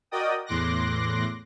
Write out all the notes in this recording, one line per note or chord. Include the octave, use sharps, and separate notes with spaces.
F#4 A#4 D5 D#5 G5 D#6
E2 A2 C6 D6 F#6 A#6